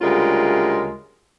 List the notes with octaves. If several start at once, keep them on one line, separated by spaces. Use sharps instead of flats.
D2 C#3 G3 G#3 F4 A#4